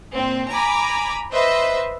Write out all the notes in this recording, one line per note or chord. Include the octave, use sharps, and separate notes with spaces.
A#2 C4
G#5 A#5 B5 D6
B4 C5 D#5 E5